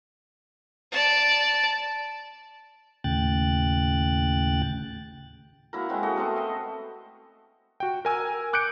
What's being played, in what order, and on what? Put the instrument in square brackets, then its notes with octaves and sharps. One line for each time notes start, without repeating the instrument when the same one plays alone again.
[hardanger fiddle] D5 A5
[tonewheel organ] D#2 A2 C#3 G5 F#6 A6
[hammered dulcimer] A#3 E4 F#4 A#4
G#3 C4 F#4
F#4 A4 D#5 E5
A3 B3 C4 A#4
D#5 E5
[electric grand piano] F#4 G5
A#4 G#5 E6
D6 F#6 G6 C#7 D7